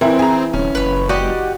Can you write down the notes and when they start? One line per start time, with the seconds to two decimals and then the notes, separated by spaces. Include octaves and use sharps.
0.01 E3 C4 E4 A#4
0.19 G#4 A#5
0.53 D1 C#4
0.75 F#1 B4 C#5
1.09 F#4 G4 D5 D#5 F#5